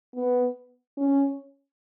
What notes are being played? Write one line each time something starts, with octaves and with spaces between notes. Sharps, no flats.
B3
C#4